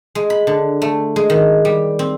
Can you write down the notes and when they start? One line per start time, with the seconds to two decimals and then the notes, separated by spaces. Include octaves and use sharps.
0.15 G#3
0.30 B5
0.47 D3
0.82 A3
1.16 G#3
1.30 D#3
1.65 G3
1.99 C4